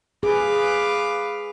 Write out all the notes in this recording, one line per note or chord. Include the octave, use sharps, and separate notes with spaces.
G#4 B4 F5 D6